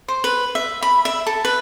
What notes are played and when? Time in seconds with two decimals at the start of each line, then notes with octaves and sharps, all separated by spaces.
0.08 C5
0.24 B4
0.55 E5
0.82 B5
1.05 E5
1.27 A4
1.45 B4